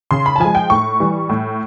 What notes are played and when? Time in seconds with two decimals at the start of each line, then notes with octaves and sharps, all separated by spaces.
0.11 C#3 C6
0.26 B5
0.36 A5
0.40 F3 G#3 G#5
0.55 G5
0.70 A2 C#6
1.00 E3 G3
1.29 A2